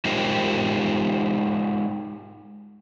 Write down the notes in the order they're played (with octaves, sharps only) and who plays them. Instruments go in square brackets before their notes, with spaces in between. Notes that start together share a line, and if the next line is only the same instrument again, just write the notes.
[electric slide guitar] G#3 D#4 F4 G4 A#4 C5